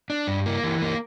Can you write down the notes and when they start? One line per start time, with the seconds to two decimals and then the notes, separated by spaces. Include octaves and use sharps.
0.10 D4
0.27 G2
0.46 A#3
0.64 E3
0.82 A#3